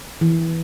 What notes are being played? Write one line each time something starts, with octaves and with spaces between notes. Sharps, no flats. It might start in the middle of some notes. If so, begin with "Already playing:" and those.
E3